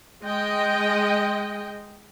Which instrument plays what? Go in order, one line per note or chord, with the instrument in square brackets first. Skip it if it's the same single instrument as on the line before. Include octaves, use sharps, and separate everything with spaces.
[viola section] G#3 D#5 G5